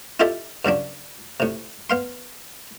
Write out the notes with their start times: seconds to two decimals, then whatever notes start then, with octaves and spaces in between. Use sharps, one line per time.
0.20 E4 F4 G4 A4 D#5 E5
0.65 G2 C#3 F#3 D4
1.40 A2 C3
1.90 B3 F5 C6